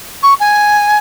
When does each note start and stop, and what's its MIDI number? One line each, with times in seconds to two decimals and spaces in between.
0.23 0.34 85
0.40 0.98 80